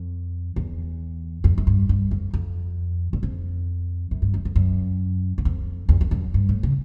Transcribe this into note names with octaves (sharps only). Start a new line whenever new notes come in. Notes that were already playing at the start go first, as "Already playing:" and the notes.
Already playing: F2
E2
F2
F#2
G2
G2
F2
F2
E2
F2
F#2
G2
F#2
F2
F#2
E2
F2
E2
F2
F#2
G2
A2
C#3